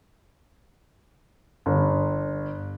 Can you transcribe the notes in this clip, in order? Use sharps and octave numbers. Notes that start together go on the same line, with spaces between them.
G1